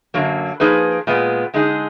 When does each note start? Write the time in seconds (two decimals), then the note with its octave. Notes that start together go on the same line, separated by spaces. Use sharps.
0.14 F#2 D3 F#3 A#3
0.60 F3 A#3 D#4 G#4 B4
1.07 A#2 G#3 B3
1.54 D3 G#3 D#4 G#4